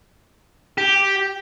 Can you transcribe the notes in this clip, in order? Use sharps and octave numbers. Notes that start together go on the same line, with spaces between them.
G4